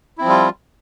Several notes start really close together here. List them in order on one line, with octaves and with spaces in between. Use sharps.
E4 C4 F3 G3 F4